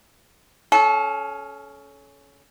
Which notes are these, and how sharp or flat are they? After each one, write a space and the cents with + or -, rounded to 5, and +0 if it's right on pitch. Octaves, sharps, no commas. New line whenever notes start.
C#4 +10 A4 -30